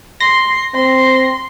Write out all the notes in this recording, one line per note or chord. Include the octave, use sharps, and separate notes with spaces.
C6 A#6
C4 C6